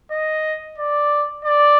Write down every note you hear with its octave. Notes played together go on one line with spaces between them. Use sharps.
D#5
D5
D5